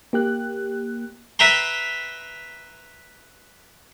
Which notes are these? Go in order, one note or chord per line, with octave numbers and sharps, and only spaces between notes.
A#3 G4 F#6
B4 E5 G5 A#5 C6